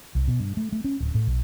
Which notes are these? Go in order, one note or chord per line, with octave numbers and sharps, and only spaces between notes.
C2
B2
G2
A3
A3
C#4
D1
A2
B1